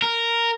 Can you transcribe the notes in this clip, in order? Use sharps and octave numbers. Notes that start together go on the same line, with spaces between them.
A#4